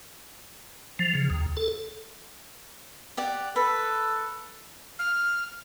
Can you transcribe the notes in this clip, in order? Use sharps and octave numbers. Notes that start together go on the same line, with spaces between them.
F3
C#3
D#2
A4
G4 D5 F#5
A4 B4
F6